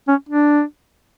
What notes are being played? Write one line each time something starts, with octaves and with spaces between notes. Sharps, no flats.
C#4
D4